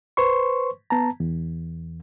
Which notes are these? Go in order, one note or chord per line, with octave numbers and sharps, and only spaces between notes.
B4 C5 C6 C#6
B3 A5 A#5
E2